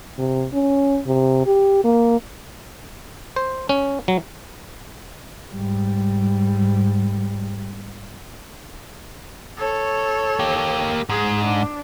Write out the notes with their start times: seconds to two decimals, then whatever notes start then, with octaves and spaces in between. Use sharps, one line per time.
0.18 C3
0.54 C#4
1.07 C3
1.46 G4
1.84 A#3
3.36 C5
3.69 C#4
4.08 F#3
5.51 G#2 G3
9.58 A4 C#5
10.40 A#3 G4
11.09 G#2 G#4
11.44 D4